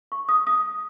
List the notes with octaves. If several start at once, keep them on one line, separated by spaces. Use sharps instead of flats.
C#6
D#6
D#6